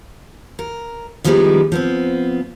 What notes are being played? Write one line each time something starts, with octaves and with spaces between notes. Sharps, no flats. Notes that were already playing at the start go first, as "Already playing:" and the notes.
A#4
D#3 F3 G3 G#3 B3 E4
F3 B3 C4